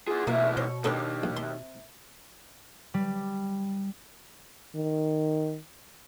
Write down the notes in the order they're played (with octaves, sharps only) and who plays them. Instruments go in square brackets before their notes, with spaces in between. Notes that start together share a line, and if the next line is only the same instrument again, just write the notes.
[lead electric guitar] E4 G#4 [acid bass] F4
[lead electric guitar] D2 E3 [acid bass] B2 [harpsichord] A#3 [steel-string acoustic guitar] G#4 E5
[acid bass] B2 [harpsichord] C5 [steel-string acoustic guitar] C#5
[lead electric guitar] D#2 [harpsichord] B3 A4 C#5 [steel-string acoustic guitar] D4 G4
[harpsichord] A#1
[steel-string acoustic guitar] C3 [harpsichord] C6
[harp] G3
[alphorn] D#3